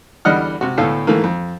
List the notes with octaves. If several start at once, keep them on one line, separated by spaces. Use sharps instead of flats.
E2 D3 G3 D#5 F#5 F6
C3 F#4
D2 A2 B3 A4 F5
G#2 D#3 E3 A3 A#3
F2